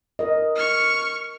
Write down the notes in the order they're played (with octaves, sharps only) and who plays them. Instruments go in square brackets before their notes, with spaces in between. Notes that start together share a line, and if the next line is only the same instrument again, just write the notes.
[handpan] A#4 D#5
[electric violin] C#6 F6